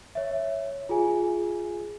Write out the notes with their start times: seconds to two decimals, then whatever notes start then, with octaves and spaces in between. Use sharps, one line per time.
0.15 C#5 E5
0.89 F4 G#4 G#5